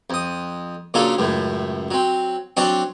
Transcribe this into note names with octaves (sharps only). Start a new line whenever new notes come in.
F2 D#6
A#2 C#3 F#3 A#3 D4 A4
C#2 F#2 A2
F#3 C4
F#3 C4 D4 F#4 C5 D5